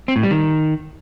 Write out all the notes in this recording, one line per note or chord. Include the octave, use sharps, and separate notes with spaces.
C4
A2
G3
D#3